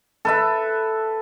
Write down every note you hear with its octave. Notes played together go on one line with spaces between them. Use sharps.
A4 B4 E5